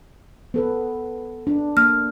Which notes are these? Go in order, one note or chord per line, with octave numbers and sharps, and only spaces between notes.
B3 A4 B4
D4
A#3 F6